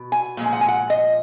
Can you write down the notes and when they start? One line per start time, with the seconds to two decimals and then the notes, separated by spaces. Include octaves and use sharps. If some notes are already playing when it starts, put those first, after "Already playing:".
Already playing: B2
0.12 G#5
0.37 A#2 F3 G#3
0.46 G#5
0.53 F#5
0.61 G#5
0.68 F#5
0.90 D#5